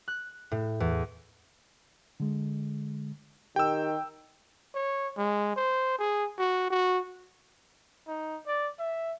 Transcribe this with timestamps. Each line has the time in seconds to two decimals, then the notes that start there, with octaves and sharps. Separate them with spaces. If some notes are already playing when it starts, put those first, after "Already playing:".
0.08 F#6
0.51 A2
0.80 E2
2.20 D3 G#3
3.56 D#3 G4 G5 E6
4.75 C#5
5.17 G#3
5.56 C5
5.99 G#4
6.38 F#4
6.71 F#4
8.07 D#4
8.47 D5
8.79 E5